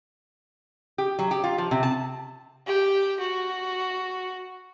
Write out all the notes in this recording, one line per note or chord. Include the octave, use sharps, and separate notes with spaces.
G4
F#3
G4
F4
F3
C3
A5
G4
F#4